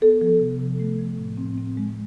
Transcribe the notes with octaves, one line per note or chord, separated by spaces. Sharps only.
B3 A4
F3
C3
C3
A3
F3
A2
C4
C4
G#3